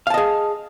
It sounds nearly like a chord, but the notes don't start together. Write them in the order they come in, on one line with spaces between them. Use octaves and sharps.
F5 A5 D#5 G#4